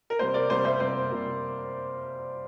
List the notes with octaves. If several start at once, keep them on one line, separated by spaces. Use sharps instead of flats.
A#4
C3 G3 A#3 C5
A#4 D5
C3 G3 A#3 C5
C5 E5
C3 G3 A#3 C5
C3 G3 A#3